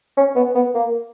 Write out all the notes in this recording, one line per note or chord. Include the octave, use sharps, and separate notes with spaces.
C#4
B3
B3
A#3